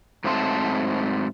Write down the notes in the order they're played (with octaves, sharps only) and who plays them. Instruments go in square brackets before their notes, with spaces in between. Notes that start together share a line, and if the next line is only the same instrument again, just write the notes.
[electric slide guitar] G#2 F#3 A3 C4 C5 A5